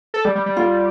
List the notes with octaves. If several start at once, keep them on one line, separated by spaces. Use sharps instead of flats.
A4
G3
G3
G3
F4